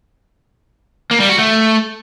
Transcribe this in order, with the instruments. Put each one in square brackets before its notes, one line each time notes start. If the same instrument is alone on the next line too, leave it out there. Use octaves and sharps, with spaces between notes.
[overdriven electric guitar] A#3
G3
F#4
A3